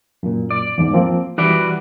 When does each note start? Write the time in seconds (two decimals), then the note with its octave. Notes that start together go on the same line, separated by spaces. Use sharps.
0.23 F#2 A#2
0.51 D5
0.78 E2 G#2
0.93 F3 A#3 C4
1.38 E3 G3 F#4 B4 D5